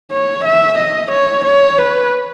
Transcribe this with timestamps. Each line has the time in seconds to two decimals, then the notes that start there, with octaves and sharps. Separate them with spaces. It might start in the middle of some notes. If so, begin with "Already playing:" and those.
0.12 C#5
0.45 E5
0.79 D#5
1.12 C#5
1.45 C#5
1.78 B4